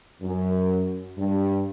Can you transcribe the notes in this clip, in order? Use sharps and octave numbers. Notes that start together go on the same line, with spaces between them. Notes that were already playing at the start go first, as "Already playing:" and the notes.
F#2
G2